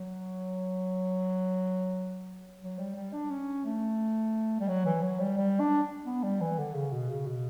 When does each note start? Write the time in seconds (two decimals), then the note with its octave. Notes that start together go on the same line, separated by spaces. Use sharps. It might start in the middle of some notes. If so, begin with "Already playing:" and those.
Already playing: F#3
2.61 F#3
2.79 G3
2.96 G3
3.13 D4
3.30 C#4
3.65 A3
4.60 G3
4.68 F#3
4.86 E3
5.02 F#3
5.20 G3
5.37 G3
5.60 D4
6.06 B3
6.23 G3
6.41 E3
6.59 D3
6.75 C#3
6.93 B2
7.10 C#3
7.27 B2